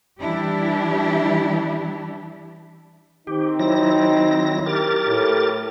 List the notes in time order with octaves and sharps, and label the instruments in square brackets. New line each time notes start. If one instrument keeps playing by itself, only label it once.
[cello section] E3 G3 D4 E4 G4
[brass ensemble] D#3 C4 D#4 [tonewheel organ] G4
[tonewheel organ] F#3 E4 A#6
G4 A#4 A6
[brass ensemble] A2